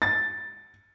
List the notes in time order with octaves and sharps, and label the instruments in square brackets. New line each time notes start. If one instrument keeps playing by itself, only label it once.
[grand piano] A6